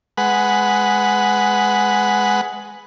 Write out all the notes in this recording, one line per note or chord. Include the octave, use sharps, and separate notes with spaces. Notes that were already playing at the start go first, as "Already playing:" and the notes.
G#3 B4 F#5